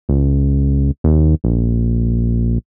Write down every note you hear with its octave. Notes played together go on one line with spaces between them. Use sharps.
C#2
D#2
A#1